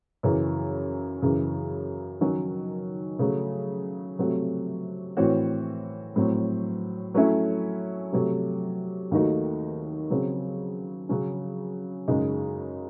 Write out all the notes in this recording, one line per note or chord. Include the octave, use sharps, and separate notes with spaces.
F#2 C#3 E3
F#2 C#3 E3
D#3 F#3 C#4 F#4
C#3 F#3 A3
C3 F#3 A3 C4 F#4
A2 E3 C4 F#4 C#5
A2 F#3 C4
F#3 A3 C#4 E4
C3 F#3 A3
D#2 D#3 A3 D#4 F#4
C#3 F#3 C4
C#3 F#3 C#4
F#2 C#3 G#3 D#4 G#4